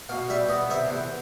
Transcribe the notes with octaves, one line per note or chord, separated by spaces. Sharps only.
B2 F5
G3 E5
B3 D#5
C3 E5
E2